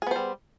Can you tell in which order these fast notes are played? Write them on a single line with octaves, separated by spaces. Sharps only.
G#4 B3 C5 G3